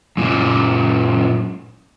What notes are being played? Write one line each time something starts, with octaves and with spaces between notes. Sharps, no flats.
F#2 A#2